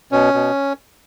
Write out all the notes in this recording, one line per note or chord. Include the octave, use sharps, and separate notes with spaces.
B2 C#4
B2